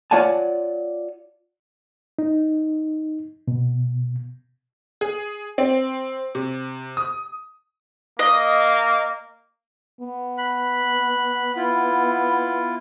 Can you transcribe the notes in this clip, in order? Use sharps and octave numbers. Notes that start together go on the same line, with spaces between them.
F4 C#5 D5 F#5 G#5 A5
D#4
B2
G#4
C4
C3
D#6
A#3 D#5
B3
B5 F#6
E4 F4